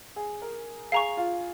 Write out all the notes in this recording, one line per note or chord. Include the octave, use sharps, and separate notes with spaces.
G#4
A#4
G#4 F5 A#5 C#6
F4